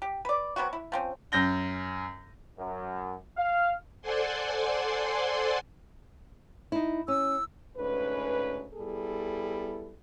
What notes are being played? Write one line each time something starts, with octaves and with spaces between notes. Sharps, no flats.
G4
B4 D5
F#3 B3 C4 F#4
E4
F3 C4 C#4
F#2 G6 A#6 G7
F#2
F5
A4 C5 D5 F#5 G#5 C6
D#4 E4
C#4 E6
D2 G#2 C#4 B4
G3 B3 E4 G#4 A4